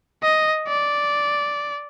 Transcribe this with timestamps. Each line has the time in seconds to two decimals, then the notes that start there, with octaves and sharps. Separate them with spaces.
0.23 D#5
0.67 D5